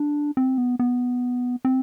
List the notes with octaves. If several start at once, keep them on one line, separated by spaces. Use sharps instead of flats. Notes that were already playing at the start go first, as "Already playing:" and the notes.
Already playing: D4
C4
B3
B3
C4